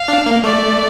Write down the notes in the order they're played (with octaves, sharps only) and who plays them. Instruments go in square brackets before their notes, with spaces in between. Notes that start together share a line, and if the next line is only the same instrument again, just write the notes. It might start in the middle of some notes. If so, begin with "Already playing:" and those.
Already playing: [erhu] F5
[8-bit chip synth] D4
A#3
[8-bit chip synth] A3 [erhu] D5